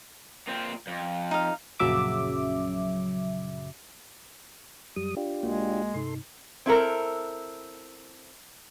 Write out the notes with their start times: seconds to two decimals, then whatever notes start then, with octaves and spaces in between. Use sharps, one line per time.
0.48 A#2 C4
0.87 F2
1.31 D#4 F5
1.79 A#1 F#2 C#3 F#3 E5 D6
4.96 F#2 G3 D#6
5.17 D4 F4 G4
5.43 B1 G#3 A#3 F#4
5.94 G2 C3 D#4 A4 C6
6.66 C4 E4 A4 A#4